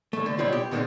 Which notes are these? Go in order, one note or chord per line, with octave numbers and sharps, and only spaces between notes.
D#2 A3
D3
B2 F#3 G3 F4
G4
B2 D3 D#3 F#3 G#3 C4